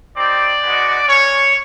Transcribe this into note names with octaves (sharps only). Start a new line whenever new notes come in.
C4 D#4 G4 D5
G#3 B3 D#4 F#4
G3 A#3 C#4 C#5